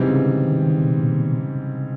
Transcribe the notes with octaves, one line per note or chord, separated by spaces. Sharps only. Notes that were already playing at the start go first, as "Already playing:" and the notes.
Already playing: G#2 C3 E3 G3 C4
C#3
D3
D#3
D#3
B2
B2
A#2
B2
C#3
C3
C3